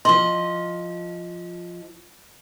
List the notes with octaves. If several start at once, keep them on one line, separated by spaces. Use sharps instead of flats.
F3 D#5 C6